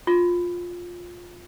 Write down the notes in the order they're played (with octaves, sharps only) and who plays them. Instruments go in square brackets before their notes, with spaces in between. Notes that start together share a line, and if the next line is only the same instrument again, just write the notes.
[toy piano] F4